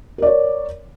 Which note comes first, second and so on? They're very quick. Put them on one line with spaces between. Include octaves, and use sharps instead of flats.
A#4 D5 C#5